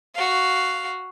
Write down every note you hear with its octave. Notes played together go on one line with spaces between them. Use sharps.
F#4 F5